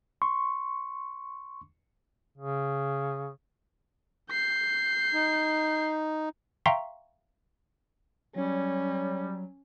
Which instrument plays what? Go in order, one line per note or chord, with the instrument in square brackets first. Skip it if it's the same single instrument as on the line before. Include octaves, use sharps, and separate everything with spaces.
[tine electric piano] C6 C#6
[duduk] C#3
[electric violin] G6 C7
[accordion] D#4
[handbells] E5 F5 G5 A#5 C6 C#6
[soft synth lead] F#3 [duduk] G3 [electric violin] C#4 [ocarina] C#5